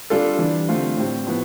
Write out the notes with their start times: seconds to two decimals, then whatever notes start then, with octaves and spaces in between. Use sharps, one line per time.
0.10 G3 D4 F4 A4
0.39 E3 G3 D4
0.68 D3 A3 C4 F4
0.97 A2 G3 C4
1.27 A2 F3 B3